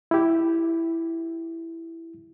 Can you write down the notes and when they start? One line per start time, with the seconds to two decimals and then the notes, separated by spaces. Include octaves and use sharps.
0.11 E4 G4